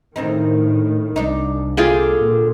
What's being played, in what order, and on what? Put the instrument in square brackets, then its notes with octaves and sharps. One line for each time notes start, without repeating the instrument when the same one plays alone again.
[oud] D2 C4 D#4 [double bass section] A2 D#3
[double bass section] C2 [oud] D4 D#4
[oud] D3 A#3 G4 [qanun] F4 G#4 G5
[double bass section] A#2